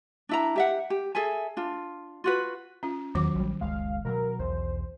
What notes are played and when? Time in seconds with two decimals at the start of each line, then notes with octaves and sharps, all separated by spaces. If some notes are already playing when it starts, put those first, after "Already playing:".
0.29 D4 E4 A#5
0.56 G4 E5 F#5
0.90 G4
1.15 G#4 A4 E5 G#5
1.57 D4 F4
2.24 F4 F#4 B4
2.83 C#4 F4
3.15 E2 D#3 F#3 D6
3.36 A#1 G3
3.61 F#1 C#2 G#3 F5
4.05 B2 F3 F#3 A#4
4.39 B1 E2 C5